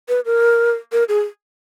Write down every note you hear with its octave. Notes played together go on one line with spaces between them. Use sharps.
B4
A#4
A#4
G#4